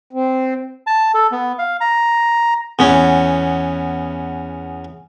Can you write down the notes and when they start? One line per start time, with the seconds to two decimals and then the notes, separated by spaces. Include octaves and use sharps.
0.13 C4
0.87 A5
1.14 A4
1.32 B3
1.59 F5
1.81 A#5
2.79 E2 B3 C#4